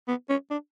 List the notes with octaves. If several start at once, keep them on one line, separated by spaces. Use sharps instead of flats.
B3
C#4
D4